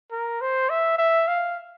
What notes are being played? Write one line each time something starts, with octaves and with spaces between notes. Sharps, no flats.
A#4
C5
E5
E5
F5